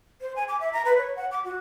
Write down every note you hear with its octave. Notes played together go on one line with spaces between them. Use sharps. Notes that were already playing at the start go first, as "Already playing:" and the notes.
C5
G#5
D6
E5
A#5
B4
C#5
F#5
D6
F#4